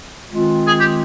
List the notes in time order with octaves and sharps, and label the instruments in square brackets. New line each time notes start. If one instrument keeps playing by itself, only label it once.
[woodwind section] D#3 G#3 C4 F4
[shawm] G#4
G4